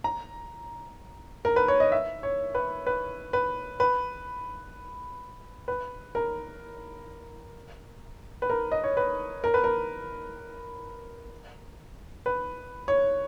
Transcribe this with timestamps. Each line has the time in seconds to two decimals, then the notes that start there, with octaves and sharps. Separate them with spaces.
0.04 A#5
1.45 A#4
1.56 B4
1.68 C#5
1.80 D#5
1.92 E5
2.23 C#5
2.55 B4
2.87 B4
3.33 B4
3.80 B4
5.68 B4
6.15 A#4
8.42 B4
8.50 A#4
8.72 D#5
8.84 C#5
8.97 B4
9.44 A#4
9.54 B4
9.64 A#4
12.26 B4
12.88 C#5